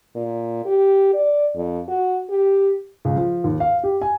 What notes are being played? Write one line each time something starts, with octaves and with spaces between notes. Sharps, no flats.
A#2
G4
D5
F2
F#4
G4
C#2
F3
D#2
F5
G4
G#5